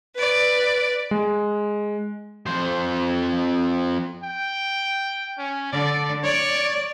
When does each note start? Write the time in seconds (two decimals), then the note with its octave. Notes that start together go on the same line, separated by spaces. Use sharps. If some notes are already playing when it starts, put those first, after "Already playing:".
0.16 B4 D5
1.11 G#3
2.47 F2 C5
4.24 G5
5.38 C#4
5.73 D3 D5
6.24 C#5 D5